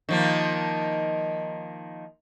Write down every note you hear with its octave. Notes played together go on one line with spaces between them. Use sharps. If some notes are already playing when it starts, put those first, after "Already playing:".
D#3 F3 A#3